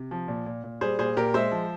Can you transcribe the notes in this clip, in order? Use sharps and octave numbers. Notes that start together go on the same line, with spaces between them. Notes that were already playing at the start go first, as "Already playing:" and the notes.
Already playing: C3
F3
A#2
A#2
A#2
G3 G#4 C5
A#2 G#4 C5
A#2 G4 A#4
G#3 C5 E5
F3